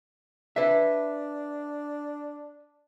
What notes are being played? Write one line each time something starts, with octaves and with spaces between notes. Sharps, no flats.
D4 B4 E5